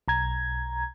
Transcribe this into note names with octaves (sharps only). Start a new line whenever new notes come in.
B1 A#5 G#6